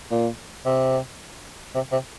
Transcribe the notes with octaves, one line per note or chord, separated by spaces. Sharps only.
A#2
C3
C3
C3